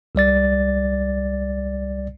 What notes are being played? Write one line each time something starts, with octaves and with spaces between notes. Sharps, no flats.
C2 G3 D5 A6